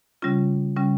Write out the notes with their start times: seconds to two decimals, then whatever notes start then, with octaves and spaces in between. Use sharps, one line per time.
0.22 C#3 G3 C#4 F4
0.76 C#3 G3 C#4